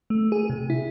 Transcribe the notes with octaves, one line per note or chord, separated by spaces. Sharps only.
A3
G#4
C3
E4